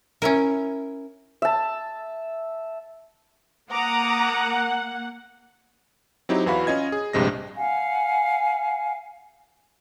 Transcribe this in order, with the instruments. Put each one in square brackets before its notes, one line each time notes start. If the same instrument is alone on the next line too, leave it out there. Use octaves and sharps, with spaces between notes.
[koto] C#4 E4 A#4
[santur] E5 A5
[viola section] A#3 F#5 [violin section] A#5 D6 D#6
[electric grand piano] F#3 C4 D#4 E4 G4
E2 E3 F#4 F5 B5
C#4 F4 D#5 G#6
G#4
A#1 G2 C3 G#3 A#6
[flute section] F5 F#5 G#5